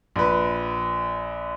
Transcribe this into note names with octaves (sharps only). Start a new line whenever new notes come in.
A#1 B4